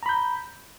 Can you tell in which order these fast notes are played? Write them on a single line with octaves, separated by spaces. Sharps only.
A#5 B5 G6